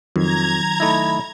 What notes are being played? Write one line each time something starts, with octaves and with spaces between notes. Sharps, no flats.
F2 D#3 F#3 A#5 G#6
A3 D#4 E4 B5